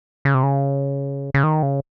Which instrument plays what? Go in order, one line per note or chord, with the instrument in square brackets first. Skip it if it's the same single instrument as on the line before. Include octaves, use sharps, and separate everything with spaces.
[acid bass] C#3
C3
C#3
C#3
D#3
C#3